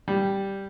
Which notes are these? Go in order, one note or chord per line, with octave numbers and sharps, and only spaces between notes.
G3